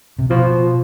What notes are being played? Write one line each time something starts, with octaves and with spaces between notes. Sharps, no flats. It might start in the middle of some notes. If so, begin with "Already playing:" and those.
C3
B2 F3